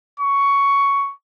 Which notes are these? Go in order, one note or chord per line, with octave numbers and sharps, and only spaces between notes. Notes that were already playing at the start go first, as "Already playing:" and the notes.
C#6